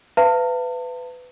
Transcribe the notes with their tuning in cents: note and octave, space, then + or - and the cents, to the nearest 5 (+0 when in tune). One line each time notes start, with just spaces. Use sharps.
B4 +20 F5 -45 A5 +40